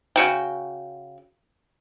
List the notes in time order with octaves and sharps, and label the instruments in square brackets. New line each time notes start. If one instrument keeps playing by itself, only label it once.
[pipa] C#3 F#4 G5